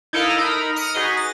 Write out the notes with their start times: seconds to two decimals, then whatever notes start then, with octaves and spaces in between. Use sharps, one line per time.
0.13 D#4 E4 A4 A#4 D#5 F5
0.38 D#4 A#4 A#5 B5
0.76 D#6 F6 C#7 D7
0.94 D#4 F#4 G#4 B4 D#5
1.17 A6 A#6